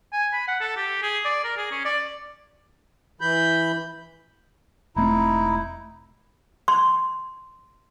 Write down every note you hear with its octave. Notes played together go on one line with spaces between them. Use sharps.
G#5
B5
F#5
A4
G4
G#4
D5
A#4
G#4
C#4
D5
E3 B5 G6
E1 A3 C4 D#4 E4
C6